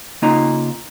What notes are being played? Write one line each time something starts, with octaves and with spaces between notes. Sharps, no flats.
C#3 A#3 D#4 F4 D#5 A#5